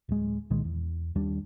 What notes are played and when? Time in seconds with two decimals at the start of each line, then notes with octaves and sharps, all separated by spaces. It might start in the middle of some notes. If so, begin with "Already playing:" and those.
0.09 D1 G#3
0.50 C2 A#2 D#3 G#3
0.65 E2
1.15 D#2 G3 D4